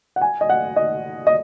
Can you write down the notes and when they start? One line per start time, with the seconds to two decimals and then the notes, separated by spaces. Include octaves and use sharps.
0.16 F#5
0.21 G#5
0.41 D#5
0.49 F#5
0.76 D#5
1.27 D#5